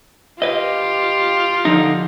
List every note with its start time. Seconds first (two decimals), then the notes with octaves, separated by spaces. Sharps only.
0.42 F4 G4 B4 D#5
1.65 D3 F3 D#4